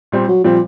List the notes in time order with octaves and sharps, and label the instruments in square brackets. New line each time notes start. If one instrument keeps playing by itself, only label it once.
[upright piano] A#2 G3 C4
[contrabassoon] F#3
[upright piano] A#2 G3 C4 [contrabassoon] F3